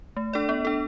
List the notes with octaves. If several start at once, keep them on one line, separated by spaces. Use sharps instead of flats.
A3
D4 A4 D5
B3
D4 A4